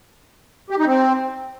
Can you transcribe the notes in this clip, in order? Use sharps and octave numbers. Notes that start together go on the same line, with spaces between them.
G4
D#4
C4